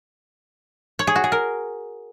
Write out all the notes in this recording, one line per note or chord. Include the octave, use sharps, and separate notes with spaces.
C#5
G#4
F#4
G#4
A#4